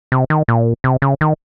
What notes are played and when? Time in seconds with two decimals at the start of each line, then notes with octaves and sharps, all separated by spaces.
0.12 C3
0.30 D#3
0.48 A#2
0.84 C3
1.02 C#3
1.21 D#3